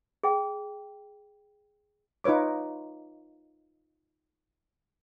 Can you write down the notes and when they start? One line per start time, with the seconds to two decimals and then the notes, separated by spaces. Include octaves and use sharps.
0.23 G#4 G5
2.24 D#4 F4 B4 C#5 D6